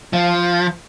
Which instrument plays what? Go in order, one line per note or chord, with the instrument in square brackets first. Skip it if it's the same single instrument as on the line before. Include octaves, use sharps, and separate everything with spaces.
[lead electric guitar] F3